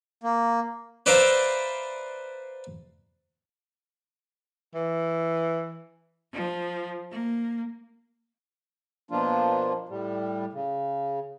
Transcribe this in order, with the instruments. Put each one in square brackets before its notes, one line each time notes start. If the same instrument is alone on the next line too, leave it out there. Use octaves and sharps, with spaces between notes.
[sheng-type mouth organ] A#3
[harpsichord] B4 C5 D5 E5 F5 A#5
[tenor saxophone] E3
[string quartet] F3
A#3
[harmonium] B2 F3 A#3 D4 F4
A2 G3
C#3